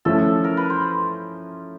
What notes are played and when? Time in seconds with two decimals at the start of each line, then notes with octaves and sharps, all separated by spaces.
0.05 F3 A3 C#4 E4 A4
0.44 A#4
0.57 B4
0.70 C5